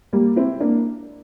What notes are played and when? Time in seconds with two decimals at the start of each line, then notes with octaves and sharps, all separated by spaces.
0.13 G3 A#3
0.36 C4 E4
0.60 A#3 D4